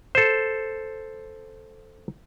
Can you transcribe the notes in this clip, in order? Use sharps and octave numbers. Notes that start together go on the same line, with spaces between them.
A4 C5